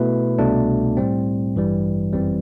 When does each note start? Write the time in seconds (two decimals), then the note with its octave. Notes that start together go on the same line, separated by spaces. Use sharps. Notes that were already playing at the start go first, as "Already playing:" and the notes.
Already playing: B2 A3 E4 B4
0.38 C2 B2 A3 D4
0.97 A2 G3 C4
1.56 A1 G2 E3 G3
2.13 G1 F#2 E3 G3 C4